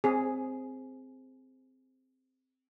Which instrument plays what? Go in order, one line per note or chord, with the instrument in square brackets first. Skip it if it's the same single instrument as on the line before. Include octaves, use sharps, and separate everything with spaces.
[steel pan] C4 G#4